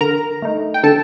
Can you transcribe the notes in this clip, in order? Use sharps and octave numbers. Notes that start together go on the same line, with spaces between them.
D3 A#4 A#5
A3 D#4
G5
D3 A4 A5